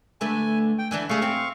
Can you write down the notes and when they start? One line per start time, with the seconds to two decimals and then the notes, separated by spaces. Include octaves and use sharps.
0.21 D3 A3 B4 G#5
0.78 G5
0.91 D3 E3 D4 G#5
1.09 A3 G#4 F5 C#6
1.22 C4